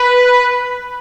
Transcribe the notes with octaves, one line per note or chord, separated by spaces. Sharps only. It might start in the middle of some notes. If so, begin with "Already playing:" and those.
Already playing: B4